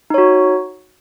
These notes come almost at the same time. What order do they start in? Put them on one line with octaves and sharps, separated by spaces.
D#4 C#5 F#4